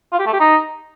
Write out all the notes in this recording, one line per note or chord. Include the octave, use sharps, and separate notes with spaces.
F4
G4
A3
G4
D#4